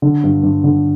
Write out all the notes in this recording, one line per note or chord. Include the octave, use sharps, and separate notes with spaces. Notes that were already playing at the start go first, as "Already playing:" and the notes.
D3
G2
G2
D3